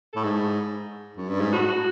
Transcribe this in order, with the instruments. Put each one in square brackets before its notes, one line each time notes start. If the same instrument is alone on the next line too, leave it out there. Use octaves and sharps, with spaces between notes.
[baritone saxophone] A2 [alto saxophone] A4
[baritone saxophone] G#2 [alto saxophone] G#4
[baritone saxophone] F#2
G2
G#2
[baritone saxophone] A2 [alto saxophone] F#4